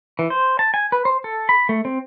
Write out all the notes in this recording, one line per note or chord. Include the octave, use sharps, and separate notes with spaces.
E3
C5
A5
G#5
B4
C5
A4
B5
A3
C4